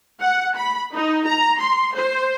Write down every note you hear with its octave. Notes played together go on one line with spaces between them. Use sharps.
F#5
B5
D#4
A#5
C6
C5